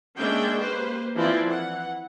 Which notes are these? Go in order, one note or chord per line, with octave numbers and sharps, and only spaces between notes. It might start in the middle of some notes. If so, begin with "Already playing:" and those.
G#3 A#3 C#4 D4 E5 G5
A#3 G4 B4 C5
E3 F3 C4 E4 D5
E3 F#5